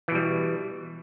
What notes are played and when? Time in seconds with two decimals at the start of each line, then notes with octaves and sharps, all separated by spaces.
0.08 E3
0.12 B2
0.15 G3